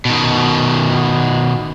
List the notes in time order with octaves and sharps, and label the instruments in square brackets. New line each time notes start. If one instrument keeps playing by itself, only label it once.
[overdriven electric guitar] B2 D#3